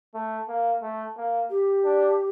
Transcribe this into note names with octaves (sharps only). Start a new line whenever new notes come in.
A3
A#3
A3
A#3
G4
D4